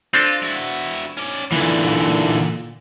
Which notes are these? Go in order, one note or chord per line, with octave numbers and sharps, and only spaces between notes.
C4 D4 F4 A4
E4 F#4
C#4 D5
A#2 D3 E3